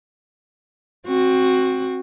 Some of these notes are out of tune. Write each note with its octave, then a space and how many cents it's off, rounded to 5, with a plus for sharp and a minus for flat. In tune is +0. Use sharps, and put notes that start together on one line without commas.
C4 +15 F#4 +0